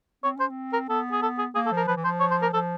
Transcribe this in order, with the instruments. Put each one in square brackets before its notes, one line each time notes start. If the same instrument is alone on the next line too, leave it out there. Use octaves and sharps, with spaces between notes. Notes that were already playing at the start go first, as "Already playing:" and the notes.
[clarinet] C4 [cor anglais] C#5
[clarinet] C#4 [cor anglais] C5
[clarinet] C4
[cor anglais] A#4
[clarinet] B3 [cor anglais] A4
[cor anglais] G#4
A4
G#4
[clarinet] A#3 [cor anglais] G#4
[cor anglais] A4
[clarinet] F3
[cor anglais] A#4
[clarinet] F3 [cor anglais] B4
[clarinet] E3
[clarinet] F3 [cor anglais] C5
[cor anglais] C#5
C5
A#4
[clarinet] F3 [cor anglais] A4